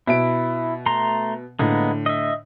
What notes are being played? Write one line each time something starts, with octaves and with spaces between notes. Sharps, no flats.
B2 E4 E5 D7
A3 A#5 C6
A2 D3 G#3 A#3 B3
D#5 E5